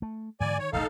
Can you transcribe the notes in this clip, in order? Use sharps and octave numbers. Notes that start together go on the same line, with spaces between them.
A3
G#2 D3 E3 D5 G#5
D#3 C#5
E1 A#1 A3 D#4 A4 F5